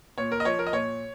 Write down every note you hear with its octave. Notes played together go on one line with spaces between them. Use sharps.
A#2 C#5
A#4
D#5
F3 C#5
A#4
D#5
A#2 C#5